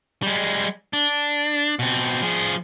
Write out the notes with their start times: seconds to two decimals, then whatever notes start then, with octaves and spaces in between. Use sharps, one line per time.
0.23 G3 G#3
0.93 D4
1.79 B2 C4
2.22 F3 G#4